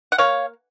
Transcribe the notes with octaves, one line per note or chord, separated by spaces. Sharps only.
F#5
A#3 C#5 F5